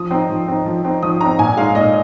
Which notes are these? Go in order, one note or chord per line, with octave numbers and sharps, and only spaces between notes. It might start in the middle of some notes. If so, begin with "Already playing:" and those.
Already playing: F3 D#6
C4 D#4
F3
C4 D#4
F3
C4 D#4
F3 D#6
C4 D#4 A#5
A#2 G#5
G#3 D#4 F5
A#2 D#5